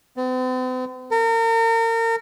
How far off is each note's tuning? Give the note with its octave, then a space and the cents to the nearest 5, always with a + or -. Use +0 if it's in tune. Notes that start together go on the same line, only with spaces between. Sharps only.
C4 -45
A#4 -35